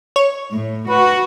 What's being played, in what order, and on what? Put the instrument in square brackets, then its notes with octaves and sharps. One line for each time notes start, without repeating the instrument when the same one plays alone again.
[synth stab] C#5
[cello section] A2
[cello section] F#4 [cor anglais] B4